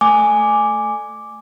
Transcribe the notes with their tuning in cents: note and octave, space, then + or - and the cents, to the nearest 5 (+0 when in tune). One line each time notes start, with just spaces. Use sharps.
A3 +0 G#5 +0 D6 +0